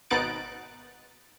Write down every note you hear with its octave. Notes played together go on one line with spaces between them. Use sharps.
G#1 B2 D#4 F#6 A6 D7